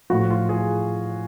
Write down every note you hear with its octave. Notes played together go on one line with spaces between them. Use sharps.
A2 F3 F#4
F4
G#4